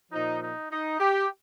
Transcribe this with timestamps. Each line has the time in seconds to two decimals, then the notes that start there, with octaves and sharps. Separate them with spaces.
0.12 A#2 F3 D#4
0.42 D#4
0.71 D#4
1.00 G4